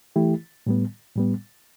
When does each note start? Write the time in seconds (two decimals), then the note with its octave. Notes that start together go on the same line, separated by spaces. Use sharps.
0.16 E3 A3 E4 G4
0.66 A2 G3 B3
1.16 A2 G3 B3